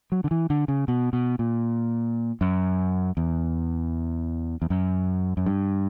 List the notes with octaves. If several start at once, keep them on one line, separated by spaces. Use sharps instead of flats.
F#3
D3
E3
D3
C#3
B2
B2
A#2
F#2
E2
E2
F#2
F#2
G2